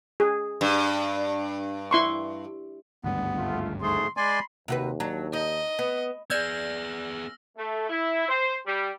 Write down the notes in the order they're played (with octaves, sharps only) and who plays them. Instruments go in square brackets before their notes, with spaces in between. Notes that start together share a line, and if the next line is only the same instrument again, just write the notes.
[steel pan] G#4
[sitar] G2
[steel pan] E4 C6 C#6
[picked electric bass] G#1 D2 G2 [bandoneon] B3
[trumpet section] A3 F4
[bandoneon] G#2 A3 G#4 [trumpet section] C6
[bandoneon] G#3 D5 G#5 [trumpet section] B5 C6
[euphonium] D#2 [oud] C3 F#4 B4
[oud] F#3 D4
[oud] D#4 [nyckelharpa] D#5
[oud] B3
[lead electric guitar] B3 G#4 [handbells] D5 G6 G#6 [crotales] E6 F6 A#6
[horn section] A3
E4
C5
G3